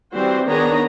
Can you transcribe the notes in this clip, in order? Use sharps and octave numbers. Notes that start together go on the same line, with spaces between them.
E3 G3 C4 F#4 C5
D#3 B3 D4 G#4 C#5 A#5